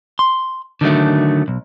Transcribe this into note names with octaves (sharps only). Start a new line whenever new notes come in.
C6
D3 D#3 F#3 A3
B1